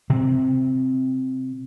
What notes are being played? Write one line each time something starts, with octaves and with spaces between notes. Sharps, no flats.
C3 C4